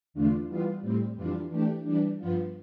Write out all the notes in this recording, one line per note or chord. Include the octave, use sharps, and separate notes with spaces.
E2 D3 A3 D4 F4
E3 G3 B3 F4
A2 G3 C4
F2 E3 G3 D4 F4
E3 A3 D4 G4
E3 G3 D4
G2 F3 B3 F4